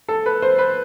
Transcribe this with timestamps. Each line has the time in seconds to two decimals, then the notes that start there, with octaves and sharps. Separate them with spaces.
0.08 A4
0.26 B4
0.42 C5
0.59 B4